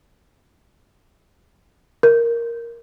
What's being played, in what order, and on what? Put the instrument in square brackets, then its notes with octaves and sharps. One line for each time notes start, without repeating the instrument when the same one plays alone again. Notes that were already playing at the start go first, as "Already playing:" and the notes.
[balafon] A#4